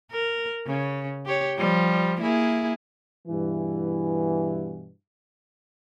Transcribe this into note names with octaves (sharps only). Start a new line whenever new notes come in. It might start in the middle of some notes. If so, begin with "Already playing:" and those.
A#4
C#3
G4 C#5
F3 G3
A#3 E4 G#4
G2 B2 E3